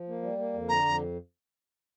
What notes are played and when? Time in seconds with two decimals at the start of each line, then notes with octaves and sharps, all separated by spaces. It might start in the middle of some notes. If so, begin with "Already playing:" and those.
Already playing: F3
0.08 A#3
0.23 G3
0.38 A#3
0.53 F2
0.68 D3 A#5
0.83 F2